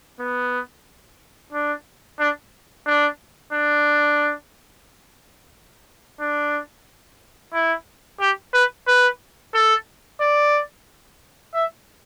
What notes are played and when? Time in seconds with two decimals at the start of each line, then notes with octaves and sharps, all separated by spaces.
0.20 B3
1.53 D4
2.20 D4
2.87 D4
3.53 D4
6.20 D4
7.54 E4
8.20 G4
8.54 B4
8.87 B4
9.54 A4
10.21 D5
11.54 E5